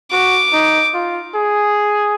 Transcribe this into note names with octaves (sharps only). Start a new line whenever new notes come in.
F#4 D6
D#4
F4
G#4